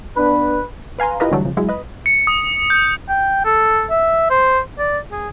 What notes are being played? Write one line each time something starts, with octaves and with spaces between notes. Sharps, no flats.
B3 D4 B4
B4 F5 G#5 A#5 C6
E4 F4 G4 A#4 B4 D#5
D3 E3 F#3 G3 A3
F2 C#3
F#3 G#3 E4
B4 D#5
C#7
D#6
G6
G5
A4
E5
C5
D5
G#4